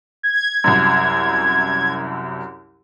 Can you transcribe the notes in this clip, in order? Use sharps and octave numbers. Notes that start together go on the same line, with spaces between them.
G#6
C2 F#2